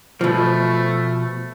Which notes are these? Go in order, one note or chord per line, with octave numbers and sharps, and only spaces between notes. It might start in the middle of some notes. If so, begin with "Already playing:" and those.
B2 F3 A3